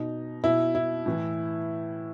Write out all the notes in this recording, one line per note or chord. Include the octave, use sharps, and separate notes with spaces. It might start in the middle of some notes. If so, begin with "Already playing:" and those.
Already playing: B2 D#4
B2 E4
E4
A2 E3